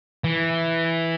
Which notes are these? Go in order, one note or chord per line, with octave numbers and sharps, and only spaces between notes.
E3